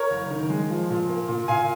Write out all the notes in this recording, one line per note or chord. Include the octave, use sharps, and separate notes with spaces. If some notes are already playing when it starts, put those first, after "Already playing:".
Already playing: A#4 C#5
F#1
D#3
G#3
F3
A#2
A#3
A#2
A#2 F5 G#5